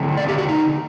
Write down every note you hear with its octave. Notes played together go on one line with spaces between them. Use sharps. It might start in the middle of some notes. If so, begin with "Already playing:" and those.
Already playing: D3 A3 C4
D5
G4
F#4
D#4